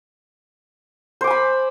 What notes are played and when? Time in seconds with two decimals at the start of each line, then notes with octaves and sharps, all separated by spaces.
1.21 C5
1.24 D6
1.27 G#5
1.31 B5